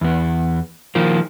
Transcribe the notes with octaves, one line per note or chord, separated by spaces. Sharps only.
E2 B3
D#3 F3 A#3